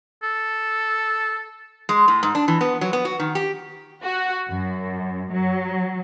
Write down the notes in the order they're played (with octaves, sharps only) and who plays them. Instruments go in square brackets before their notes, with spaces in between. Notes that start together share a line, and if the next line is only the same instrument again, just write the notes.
[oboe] A4
[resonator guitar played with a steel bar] G#3
A2
G#2
D4
E3
B3
F#3
B3
F#4
D#3
G4
[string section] F#4
F#2
F#3